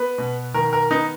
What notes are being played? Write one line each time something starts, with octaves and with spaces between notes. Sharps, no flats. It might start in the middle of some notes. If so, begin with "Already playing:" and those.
Already playing: B3 B4
B2
D#3 A#4
A#4
B3 D#4